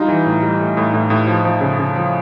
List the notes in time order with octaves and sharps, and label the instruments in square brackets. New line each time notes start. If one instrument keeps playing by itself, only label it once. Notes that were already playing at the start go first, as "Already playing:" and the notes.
Already playing: [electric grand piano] G3 D#4 F4
E3
A2
G3
A2
A2
A2
A2
F3
F3
C#3
C#3
F3